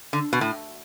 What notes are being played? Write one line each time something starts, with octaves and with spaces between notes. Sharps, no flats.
D3
B2
A2